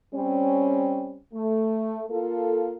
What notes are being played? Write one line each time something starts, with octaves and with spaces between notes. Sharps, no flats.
G3 C4 C#4
A3
A#3 F4 A4